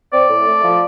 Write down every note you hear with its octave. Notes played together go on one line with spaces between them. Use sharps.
C4 D5
A2
A3
F3